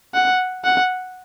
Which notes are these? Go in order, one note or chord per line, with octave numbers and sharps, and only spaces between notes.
F#5
F#5